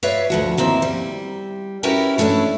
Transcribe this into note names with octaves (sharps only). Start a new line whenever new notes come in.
F#4 B4 C#5 D5 E5 F5
D2 F3 F#4
D#3 A#3 C4 E4
G3
C#4 E4 F#4 G4 A#4 B4
E3 A3 C#4 D4 E4